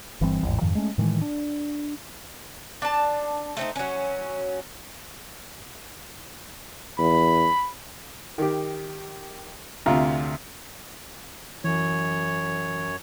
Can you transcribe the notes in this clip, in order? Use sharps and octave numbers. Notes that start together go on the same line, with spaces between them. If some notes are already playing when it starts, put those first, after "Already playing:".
G1 E3 G3 C4
A1 E2 G#2
F2 G#2 D#3 F3
G#3 A3 C#4
A2 D#3 E3 G#3
D4
D4 A5
A3 C4 D#4
F#3 C#4
E2 B5
D#3 G4
D2 C3 F4 A#5
F#2 E3 C#5